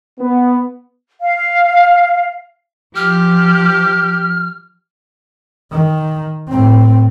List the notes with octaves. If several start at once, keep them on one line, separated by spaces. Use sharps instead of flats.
B3
F5
F3 G4 F6
D#3
A2 C4